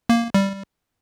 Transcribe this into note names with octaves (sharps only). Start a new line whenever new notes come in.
A#3
G3